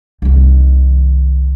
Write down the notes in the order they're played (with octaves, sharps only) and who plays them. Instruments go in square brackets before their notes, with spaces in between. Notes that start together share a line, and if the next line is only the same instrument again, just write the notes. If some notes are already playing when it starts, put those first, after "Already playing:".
[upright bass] C2 D#3